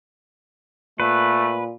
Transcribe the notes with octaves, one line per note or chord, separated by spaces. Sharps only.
A#2 A3 B4